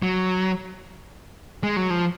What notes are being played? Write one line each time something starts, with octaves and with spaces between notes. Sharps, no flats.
F#3
G#3
F#3
F3